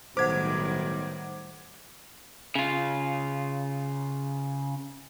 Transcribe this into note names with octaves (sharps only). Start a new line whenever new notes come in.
B1 A2 D#3 G3 C5 F#5 D6 G#6
C#3 F4